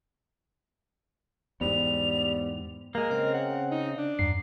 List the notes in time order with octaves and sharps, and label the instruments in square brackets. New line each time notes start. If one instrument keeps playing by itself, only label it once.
[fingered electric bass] E2 G#2 [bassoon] G3 [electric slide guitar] B3 C5 [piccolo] F7
[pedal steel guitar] G#3 A#3 [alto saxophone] A#4
[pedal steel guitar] C#3 C4 [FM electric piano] D#5
[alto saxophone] F#5
D#4
D4
[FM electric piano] E2 G2 C7